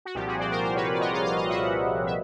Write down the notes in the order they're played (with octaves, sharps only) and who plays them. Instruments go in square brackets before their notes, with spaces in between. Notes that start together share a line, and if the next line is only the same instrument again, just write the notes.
[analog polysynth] F#4
C2 A#2 F3 G4
F#4 G#4
C5 D5
A#4 C5
A#4 C5
B4 C#5
D5
C#5 D#5
D#5 F5
D#5 F5
D#5 F5
E5 F#5
E5